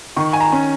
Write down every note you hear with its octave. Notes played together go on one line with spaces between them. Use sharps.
D#3 C#6
G#5
A#5
C#4